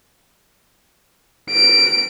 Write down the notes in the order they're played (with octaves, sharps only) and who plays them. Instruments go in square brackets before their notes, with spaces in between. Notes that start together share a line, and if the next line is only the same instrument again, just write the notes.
[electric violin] D7